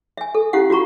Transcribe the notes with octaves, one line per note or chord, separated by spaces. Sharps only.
E5 G#5
A4
C#4 E4 G4 F5 F#5
F4 F#4 A#5 C#6